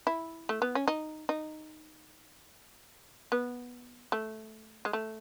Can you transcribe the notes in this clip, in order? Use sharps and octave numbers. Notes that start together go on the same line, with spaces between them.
E4
A3
B3
C#4
D#4
D#4
B3
A3
G#3
A3